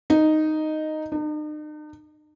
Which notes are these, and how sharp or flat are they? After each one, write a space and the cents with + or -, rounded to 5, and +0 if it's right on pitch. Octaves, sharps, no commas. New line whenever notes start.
D#4 -5
D#4 -45